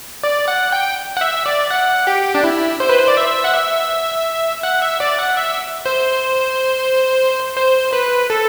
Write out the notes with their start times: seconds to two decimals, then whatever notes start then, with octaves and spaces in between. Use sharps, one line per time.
0.23 D5
0.48 F#5
0.72 G5
1.17 F#5
1.21 E5
1.46 D5
1.70 F#5
2.07 G4
2.35 D4
2.44 E4
2.80 C5
2.89 B4
2.99 C5
3.08 D5
3.17 E5
3.44 F#5
3.53 E5
4.63 F#5
4.82 E5
5.00 D5
5.18 F#5
5.37 E5
5.86 C5
7.57 C5
7.93 B4
8.30 A4